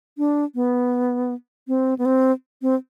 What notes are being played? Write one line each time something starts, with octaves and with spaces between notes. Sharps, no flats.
D4
B3
C4
B3
C4
C4